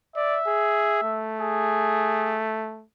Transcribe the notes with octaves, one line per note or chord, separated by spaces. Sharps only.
D5 E5
G#4
A3
G#4